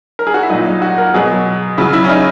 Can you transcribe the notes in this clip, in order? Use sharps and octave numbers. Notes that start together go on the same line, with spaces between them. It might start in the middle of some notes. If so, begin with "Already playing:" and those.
A#4
G#4
F#4
E4
A#2 F#3 D#4
D#4
F#4
A#4
B2 F#3 G#4
C#3 F#3 E4
E4
C#4
D#4